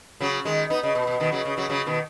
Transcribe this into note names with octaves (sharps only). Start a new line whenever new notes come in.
C#3 F#3
D#3 G#3
B3 D#4
C#3
B2
B2
B2 D#3
C#3 F#3
C#3
C#3 F#3
C#3 F#3
B2 D#3